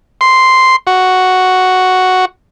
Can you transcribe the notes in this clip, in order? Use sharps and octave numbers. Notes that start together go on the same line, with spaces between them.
C6
F#4